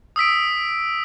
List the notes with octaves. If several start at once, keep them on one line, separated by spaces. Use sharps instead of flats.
D#6 E6 B6 D7